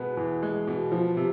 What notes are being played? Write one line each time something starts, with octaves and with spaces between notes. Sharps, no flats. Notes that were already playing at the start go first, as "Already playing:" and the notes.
Already playing: B2 G#3 B3
E2
G#3
B2
F3
C3